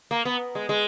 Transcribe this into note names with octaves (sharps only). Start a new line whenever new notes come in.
A#3
B3
G#3
G#3